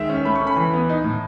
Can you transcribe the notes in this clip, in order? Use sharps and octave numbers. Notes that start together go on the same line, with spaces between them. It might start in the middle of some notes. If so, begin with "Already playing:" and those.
Already playing: D#3 G#3 E5
C#4
A3 B5
C#6
C#4
B5
E3
B3
D#4
A2